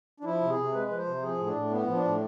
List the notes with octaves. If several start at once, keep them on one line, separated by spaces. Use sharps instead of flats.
D4
F3 E4
C3
G#4
C3
G#3 B4
F3 B4
C5
C3
F3 G#4
A2
D4
A2
B3
F3
D4
A2